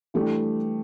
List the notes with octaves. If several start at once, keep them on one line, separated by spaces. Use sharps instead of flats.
E3 G3 A3 D4 G4